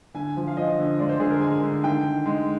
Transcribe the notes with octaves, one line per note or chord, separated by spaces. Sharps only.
D3 G#5
F3
F5
F3 D#5
D3
G#3 D5
C5
D3 G#4
A#4
G#3 G#5
D3
D#3 G5
D#3
G#3